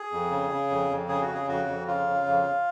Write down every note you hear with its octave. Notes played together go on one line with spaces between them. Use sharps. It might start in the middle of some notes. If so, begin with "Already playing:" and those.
Already playing: G#4
F2
C#3
C#3
F2
F2
C#3 G#4
F#4
C#3
G#4
F2 F#4
F2
C#3 F4
C#3
F2